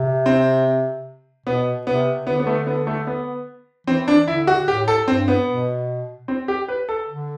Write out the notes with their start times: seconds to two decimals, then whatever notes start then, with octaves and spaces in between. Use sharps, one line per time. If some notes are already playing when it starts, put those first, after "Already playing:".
Already playing: C3
0.26 C4
1.46 B2 B3
1.87 C3 B3
2.27 D3 B3
2.40 B3
2.47 A3
2.67 B3
2.87 A3
3.07 B3
3.87 E3 C4
4.08 D4
4.28 D3 E4
4.47 F#4
4.68 A2 G4
4.88 A4
5.08 G2 C4
5.28 B3
5.48 B2
6.28 C4
6.48 G4
6.68 B4
6.89 A4
7.09 D3